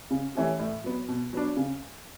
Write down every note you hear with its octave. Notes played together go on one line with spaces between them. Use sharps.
C#3
E3 A3 C#4 G4
A2
F#3 B3
B2
F#3 B3 D4
C#3